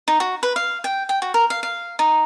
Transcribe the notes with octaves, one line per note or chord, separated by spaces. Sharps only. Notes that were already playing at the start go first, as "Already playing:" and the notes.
D#4
F#4
B4
F5
G5
G5
F#4
A#4
F5
F5
D#4